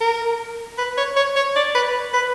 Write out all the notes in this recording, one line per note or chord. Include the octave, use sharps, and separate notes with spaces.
A#4
B4
C#5
C#5
C#5
D5
B4
B4